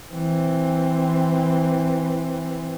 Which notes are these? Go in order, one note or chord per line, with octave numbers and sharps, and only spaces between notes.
E3 C4